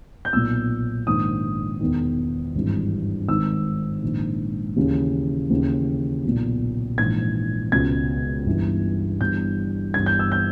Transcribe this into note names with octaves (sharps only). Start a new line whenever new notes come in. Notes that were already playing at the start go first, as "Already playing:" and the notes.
G6
B1 A#2 E6
A#1 G#2 D#3 D#6
E1 E2 D#3
G#1 G2 E3
G#1 G#2 D#3 E6
A#1 G#2 D#3
D#2 C#3 E3
D#2 C#3 E3
B1 A#2
A#1 G#2 E3 G#6
C#2 B2 G#6
G1 G2 E3
G1 G2 E3 G6
G1 G2 E3 G#6
G6
E6
G6